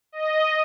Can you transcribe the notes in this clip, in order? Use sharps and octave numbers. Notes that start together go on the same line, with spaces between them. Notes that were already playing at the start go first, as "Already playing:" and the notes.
D#5